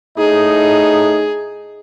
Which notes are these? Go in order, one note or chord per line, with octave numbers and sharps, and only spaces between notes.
A2 D#4 G#4